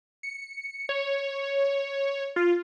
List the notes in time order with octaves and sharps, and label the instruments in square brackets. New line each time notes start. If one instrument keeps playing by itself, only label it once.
[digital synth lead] C#7
C#5
F4